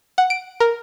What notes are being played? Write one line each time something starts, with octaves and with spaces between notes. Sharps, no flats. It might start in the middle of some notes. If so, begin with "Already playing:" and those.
F#5
D7
A#4